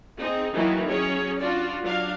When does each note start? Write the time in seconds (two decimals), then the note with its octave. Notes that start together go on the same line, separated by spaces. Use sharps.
0.19 C4 D#4 G#4
0.54 D#3 E3 F#3 A#3 D#4 E4
0.88 F#3 C#4 G#4 C#5
1.39 D4 F4 F#4 D5
1.84 F#3 D4 F5